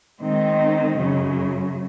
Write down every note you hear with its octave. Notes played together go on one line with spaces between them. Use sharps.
D#3 G#3 C4 D#4
F#2 C#3 F#3